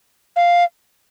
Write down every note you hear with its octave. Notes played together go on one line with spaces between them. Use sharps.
F5